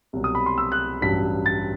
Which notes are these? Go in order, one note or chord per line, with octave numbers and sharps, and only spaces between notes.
C2 B2 F#3
D#6
B5
C6
E6
F#6
A1 G2 F#3 B6
A6